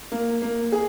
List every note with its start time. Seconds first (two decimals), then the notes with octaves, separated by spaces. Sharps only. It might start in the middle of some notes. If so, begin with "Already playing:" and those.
0.12 A#3
0.42 A#3
0.72 G#4